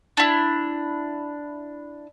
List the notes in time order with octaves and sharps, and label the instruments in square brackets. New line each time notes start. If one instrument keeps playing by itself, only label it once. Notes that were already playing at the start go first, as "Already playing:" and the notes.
[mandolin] D4 E4